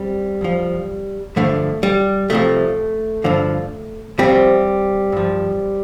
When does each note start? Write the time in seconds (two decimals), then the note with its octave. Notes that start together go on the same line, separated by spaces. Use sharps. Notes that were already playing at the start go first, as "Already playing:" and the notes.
Already playing: G3 C4
0.41 F2 F3
1.36 G2 D3 F3 A3
1.83 G3
2.30 C2 C3 F3 A3
3.24 G2 D3 F3
4.18 C2 C3 F3 G3 C4
5.12 G2 F3